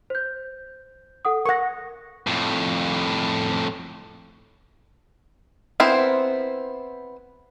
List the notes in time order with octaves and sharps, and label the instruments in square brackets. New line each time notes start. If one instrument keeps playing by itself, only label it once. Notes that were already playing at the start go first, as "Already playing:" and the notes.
[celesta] C5 G6
A4 F#5 D#6
[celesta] A#4 A#6 [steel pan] F#5 C#6
[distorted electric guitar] F2 A2
[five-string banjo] B3 C4 E4 A#4 C5